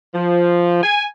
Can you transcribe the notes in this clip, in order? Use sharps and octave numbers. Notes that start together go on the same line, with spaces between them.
F3
G#5